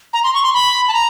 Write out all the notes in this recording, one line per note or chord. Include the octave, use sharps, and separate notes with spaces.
A#5
C6
C#6
C6
B5
A5
A#5